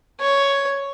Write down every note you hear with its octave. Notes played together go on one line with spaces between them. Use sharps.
C#5